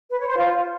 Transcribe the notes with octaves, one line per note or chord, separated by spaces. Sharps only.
B4
C#5
C5
F4